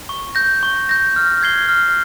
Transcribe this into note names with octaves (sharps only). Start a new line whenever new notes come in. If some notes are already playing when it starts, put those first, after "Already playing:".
C#6
G6 A#6
C#6
G6 A#6
F6
G#6 C7 G7
F6